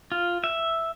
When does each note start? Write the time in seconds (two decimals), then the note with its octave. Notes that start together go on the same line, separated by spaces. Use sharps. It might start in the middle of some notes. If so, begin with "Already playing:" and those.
0.12 F4
0.44 E5